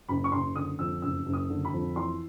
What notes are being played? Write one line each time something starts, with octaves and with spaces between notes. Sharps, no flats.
F#1 B5
C#6
F#1 C6
D3 D#6
F2 E6
F#1 E6
F#1
D#6
D3
B5
F2
E3 C6